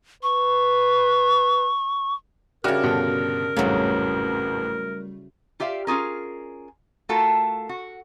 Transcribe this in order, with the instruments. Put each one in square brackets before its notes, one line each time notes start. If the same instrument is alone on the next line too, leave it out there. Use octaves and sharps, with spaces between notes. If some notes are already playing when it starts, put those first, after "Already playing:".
[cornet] B4 [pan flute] C#6
[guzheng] C#3 G3 [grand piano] D4 F#4 [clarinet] A#4 [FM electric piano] E5 F6
[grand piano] G2 B2 D3 [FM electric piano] F#4 A5
[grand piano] A1 F2 G#2 [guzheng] C#3 F#3 [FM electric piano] G3 A3
[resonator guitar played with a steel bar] F4 G4 D5 E5 F5
C#4 F4 G#4 A#4
A3 F4 F#4 A4 A#4
F#4